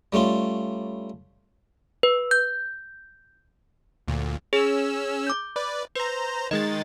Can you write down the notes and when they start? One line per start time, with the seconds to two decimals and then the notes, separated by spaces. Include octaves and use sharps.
0.13 G3 A3 C#4 F4
2.03 B4
2.31 G6
4.08 D2 A#2
4.53 C#4 G#4 E6
5.27 D6 G6
5.56 B4 D5
5.95 B4 C5 A#5
6.51 D#3 G#3 D#5 A6